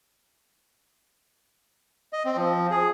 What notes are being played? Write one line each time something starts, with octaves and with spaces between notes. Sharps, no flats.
D#5
C4
F3
G#4